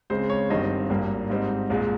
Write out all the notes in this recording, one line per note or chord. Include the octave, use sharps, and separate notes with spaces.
C#2 C#3 G#3 C4 C5
C#5
G1 G2 D#3 G3 C4 D#5
G#1 G2 G3 A#3
G#2 G3 C4 D#4
C2 A#2 G#3